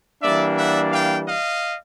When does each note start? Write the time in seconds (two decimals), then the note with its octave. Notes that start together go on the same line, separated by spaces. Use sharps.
0.22 E3 G3 A#3 D4 D5 E5
0.57 E5 F#5
0.93 F5 G5
1.28 D#5 F5